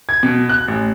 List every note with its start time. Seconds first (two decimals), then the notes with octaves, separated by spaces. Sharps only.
0.09 G#6
0.23 B2
0.49 F#6
0.68 A1